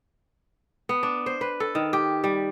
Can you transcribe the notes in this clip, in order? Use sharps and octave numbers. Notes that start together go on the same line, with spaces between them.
B3
D4
C5
B4
A4
D#3
G4
G3